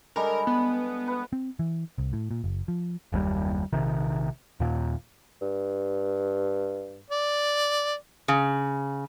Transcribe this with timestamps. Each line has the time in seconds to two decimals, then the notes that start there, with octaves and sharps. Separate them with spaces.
0.16 D3 G3 G#3 A#4
0.47 B3
1.08 B4 F#5
1.33 C4
1.59 E3
1.98 C2
2.13 A2
2.31 A#2
2.44 F#1
2.68 F3
3.12 F#1 D#2 B2 G3
3.73 A#1 C3 D#3
4.60 D#2 A#2
5.41 G2
7.10 D5
8.28 C#3